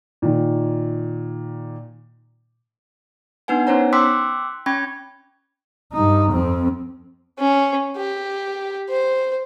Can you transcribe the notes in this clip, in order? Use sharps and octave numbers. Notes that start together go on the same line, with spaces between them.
A#2 D#3
B3 D4 D#4 B4 F#5 G#5
B3 C#4 D#4 C5 C#5 A#5
G5 C6 D6 E6 F#6 B6
C#4 G5 B5 C#6 G#6
G2 D#4
F2 C4
C#4
G4
C5